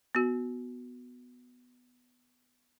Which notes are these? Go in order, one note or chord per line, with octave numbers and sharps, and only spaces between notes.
B3 F#4